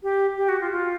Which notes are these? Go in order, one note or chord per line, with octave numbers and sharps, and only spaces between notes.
G4
G4
F#4
F4
F4